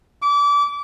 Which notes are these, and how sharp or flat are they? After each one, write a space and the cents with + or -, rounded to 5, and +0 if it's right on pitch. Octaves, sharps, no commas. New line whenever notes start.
D6 -30